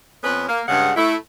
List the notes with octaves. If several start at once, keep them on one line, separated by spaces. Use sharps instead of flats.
F2 B3 C#4 B4
A#3
G2 C#3 G#3 F#5
A3 E4